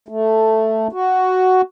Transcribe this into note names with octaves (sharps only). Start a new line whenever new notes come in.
A3
F#4